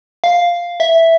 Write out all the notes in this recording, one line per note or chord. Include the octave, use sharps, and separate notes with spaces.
F5
E5